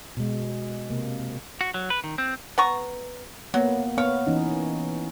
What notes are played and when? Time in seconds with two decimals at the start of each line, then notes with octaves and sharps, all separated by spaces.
0.17 B2 G#3
0.90 C3 A#3
1.61 F#4
1.74 F#3
1.90 B4
2.04 D#3
2.18 C4
2.58 B3 A#5 C#6
3.54 F#3 A#3 B3
3.98 B3 C#5 F5
4.27 E3 C#4 D#4